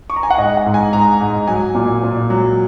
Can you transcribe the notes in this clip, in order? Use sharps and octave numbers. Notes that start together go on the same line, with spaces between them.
C#6
A#5
G#5
F#5
G#2 D#5
F#5
G#2
G#5
G#2 A#5
G#2
F#3 G#5
A#2
A#2
F#3